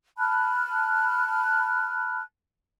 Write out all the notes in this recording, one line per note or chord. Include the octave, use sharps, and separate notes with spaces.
A5 B5 F6 F#6